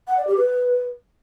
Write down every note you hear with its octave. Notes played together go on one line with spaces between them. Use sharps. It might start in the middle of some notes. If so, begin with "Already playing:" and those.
F#5
D5
G4
B4